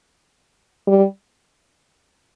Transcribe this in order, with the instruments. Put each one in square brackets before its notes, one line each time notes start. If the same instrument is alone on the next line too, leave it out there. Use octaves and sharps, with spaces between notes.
[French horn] G3